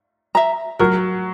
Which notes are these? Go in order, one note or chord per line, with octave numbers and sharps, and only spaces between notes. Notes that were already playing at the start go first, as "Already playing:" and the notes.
E5 A#5
F#3 A#4